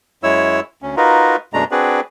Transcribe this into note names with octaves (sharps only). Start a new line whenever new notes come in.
F#2 G#3 E4 C#5 E6
D2 C#4
D#4 F4 F#4 A#4 B4
F#2 B2 G#3 A3 D4 A#5
C4 D4 F#4 G#4 B4 D5